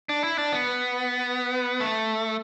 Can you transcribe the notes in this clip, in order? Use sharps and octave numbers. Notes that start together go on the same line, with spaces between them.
D4
E4
D4
B3
A3